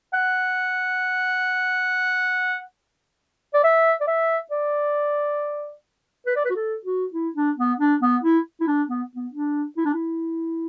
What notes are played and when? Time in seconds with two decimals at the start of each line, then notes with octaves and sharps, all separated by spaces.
0.13 F#5
3.54 D5
3.64 E5
4.00 D5
4.07 E5
4.51 D5
6.26 B4
6.36 D5
6.45 B4
6.50 F#4
6.56 A4
6.85 F#4
7.14 E4
7.36 D4
7.58 B3
7.80 D4
8.02 B3
8.23 E4
8.60 E4
8.67 D4
8.89 B3
9.15 B3
9.33 D4
9.77 E4
9.85 D4
9.94 E4